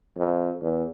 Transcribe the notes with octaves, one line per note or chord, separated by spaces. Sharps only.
F2
E2